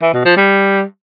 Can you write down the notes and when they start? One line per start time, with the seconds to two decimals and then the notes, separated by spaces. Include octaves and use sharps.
0.02 E3
0.13 B2
0.25 F3
0.37 G3